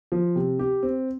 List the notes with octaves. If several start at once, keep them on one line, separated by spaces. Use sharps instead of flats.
F3
C3
G4
C4